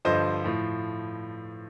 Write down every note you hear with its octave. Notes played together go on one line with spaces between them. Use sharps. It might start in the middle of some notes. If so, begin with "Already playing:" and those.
G2 D3 F3 C5 D#5
A2 F3